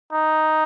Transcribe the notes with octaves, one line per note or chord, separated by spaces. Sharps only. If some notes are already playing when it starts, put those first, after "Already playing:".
D#4